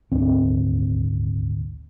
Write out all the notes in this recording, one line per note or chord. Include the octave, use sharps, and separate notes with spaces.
D#1 G#1 D2 C4